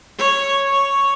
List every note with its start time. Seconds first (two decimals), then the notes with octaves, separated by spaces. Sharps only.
0.18 C#5
0.73 C#5